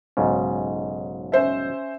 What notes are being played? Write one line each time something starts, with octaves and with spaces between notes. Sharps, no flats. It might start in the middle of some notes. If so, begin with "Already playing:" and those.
B1 G#2 C#3
C#4 C5 E5